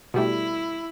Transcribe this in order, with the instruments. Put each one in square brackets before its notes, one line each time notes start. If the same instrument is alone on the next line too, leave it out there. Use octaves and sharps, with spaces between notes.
[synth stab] B2 G3 A3 [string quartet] E4